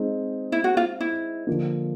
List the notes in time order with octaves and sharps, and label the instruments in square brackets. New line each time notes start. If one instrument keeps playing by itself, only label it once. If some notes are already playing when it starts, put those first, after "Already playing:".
Already playing: [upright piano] G#3 C4 D#4 G#4
[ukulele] E4
F#4
F4
E4
[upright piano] D3 F3 A#3